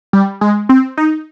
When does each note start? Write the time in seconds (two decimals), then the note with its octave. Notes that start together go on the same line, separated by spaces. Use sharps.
0.13 G3
0.41 G#3
0.69 C4
0.97 D#4